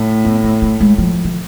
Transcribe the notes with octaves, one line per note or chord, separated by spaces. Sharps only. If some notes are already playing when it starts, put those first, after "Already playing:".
Already playing: A2
B3
B3
A3
G#3
F3
D3